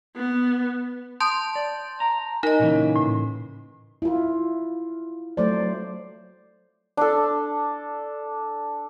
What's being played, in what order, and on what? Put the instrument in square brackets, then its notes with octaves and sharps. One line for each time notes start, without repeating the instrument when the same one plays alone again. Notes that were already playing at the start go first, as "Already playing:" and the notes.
[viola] B3
[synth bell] A5 C6 G6 [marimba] D#6
[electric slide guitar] D5
A#5
[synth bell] D#4 [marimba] A#4 D#5
[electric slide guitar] A#2 C#3 E3
[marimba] A2
[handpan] E4 F4
F#3 A3 C5 D5
[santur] D4 A4